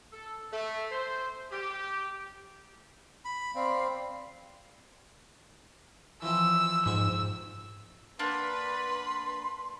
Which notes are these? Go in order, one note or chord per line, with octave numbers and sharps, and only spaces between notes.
A4
A3
C5
G4
B5
C4 D5 F5 B5
E3 F3 C4 E6
F2 G#2 C#6 E6
A#3 D4 B4 F#5 B5 C6